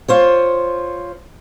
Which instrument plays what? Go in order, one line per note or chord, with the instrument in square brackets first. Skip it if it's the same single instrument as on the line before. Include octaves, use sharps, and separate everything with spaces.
[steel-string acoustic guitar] F4 C5 C#5